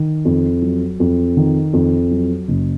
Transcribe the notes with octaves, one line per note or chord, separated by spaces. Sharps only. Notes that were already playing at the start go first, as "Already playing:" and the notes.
Already playing: D#3
F2
F#3
F2
D#3
F2
F#3
F#1